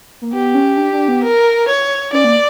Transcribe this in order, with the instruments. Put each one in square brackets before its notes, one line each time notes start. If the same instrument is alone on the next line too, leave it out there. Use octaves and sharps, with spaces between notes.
[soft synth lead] A#3
[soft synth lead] B3 [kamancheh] G4
[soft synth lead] C#4
D4
D4
B3
[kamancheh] A#4
C#5
[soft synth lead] C#4 [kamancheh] D5
[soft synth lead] A#3